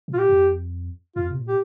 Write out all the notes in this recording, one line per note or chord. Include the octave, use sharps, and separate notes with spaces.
A#2
F4
G4
F2
F2 F4
C3
A#2
G4